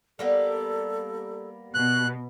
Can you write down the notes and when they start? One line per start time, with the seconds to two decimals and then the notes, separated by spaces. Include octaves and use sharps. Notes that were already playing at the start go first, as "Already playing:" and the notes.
0.19 G3 A#3 B3 A4
1.75 B2 F#6